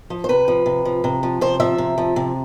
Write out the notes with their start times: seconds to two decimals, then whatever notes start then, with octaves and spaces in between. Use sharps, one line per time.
0.10 F3
0.24 C5
0.29 C3 B4
0.48 F3
0.66 C3
0.85 F3
1.04 C3
1.23 F3
1.41 C3 C5
1.60 F3 E5
1.78 C3
1.98 F3
2.16 C3